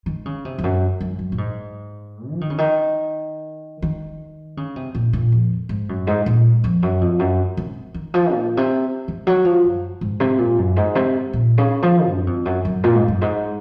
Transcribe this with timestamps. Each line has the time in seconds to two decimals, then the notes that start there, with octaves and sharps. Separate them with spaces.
0.06 D#3
0.25 C#3
0.45 C3
0.58 F2
0.64 F#2
1.01 F#2
1.19 F#2
1.32 A#2
1.38 G#2
2.31 F3
2.41 D#3
2.50 C#3
2.58 D#3
3.82 D#3
4.57 C#3
4.76 C3
4.95 A#2
5.13 A#2
5.32 F2
5.69 G#2
5.89 F#2
6.07 G#2
6.26 A#2
6.64 F2
6.83 F#2
7.01 F2
7.19 F#2
7.57 C3
7.94 D#3
8.14 F3
8.33 A#2
8.57 C3
9.08 D#3
9.27 F#3
9.45 F3
9.64 F#2
10.01 G#2
10.20 C3
10.38 A#2
10.58 F#2
10.76 G#2
10.95 C3
11.33 A#2
11.58 C#3
11.83 F3
12.08 F#2
12.27 F2
12.45 F#2
12.65 F#2
12.84 A#2
12.95 G#2
13.08 F#2
13.21 G#2